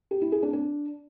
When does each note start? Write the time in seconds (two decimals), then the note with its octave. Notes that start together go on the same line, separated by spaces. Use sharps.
0.11 G4
0.21 E4
0.32 G#4
0.43 D4
0.53 D4